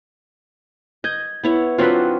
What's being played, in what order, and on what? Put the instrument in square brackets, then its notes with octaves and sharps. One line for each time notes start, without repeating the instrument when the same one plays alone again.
[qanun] D#5 [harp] G6 G#6
[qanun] B3 E4 C#5
[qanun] F#3 C4 D4 [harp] F4 F#4 B4